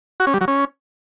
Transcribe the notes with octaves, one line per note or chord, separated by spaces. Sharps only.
F#4
C#4
G3
F#3
C#4